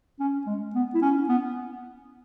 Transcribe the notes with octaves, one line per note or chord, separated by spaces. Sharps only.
C#4
G#3
B3
E4
C#4
B3